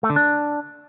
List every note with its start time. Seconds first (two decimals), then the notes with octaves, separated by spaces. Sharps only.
0.03 A3
0.10 D3
0.16 D4